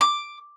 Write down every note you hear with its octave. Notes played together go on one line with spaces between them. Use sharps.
D6